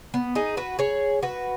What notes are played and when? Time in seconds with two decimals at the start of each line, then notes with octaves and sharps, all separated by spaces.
0.14 B3
0.35 D#4 G#4
0.57 F#4 B4
0.79 G#4 C#5
1.22 F#4 B4